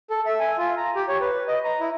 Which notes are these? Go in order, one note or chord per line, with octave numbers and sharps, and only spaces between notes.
A4
E5
G#5
F4
A#5
G4
C#5
B4
D#5
A#5
E4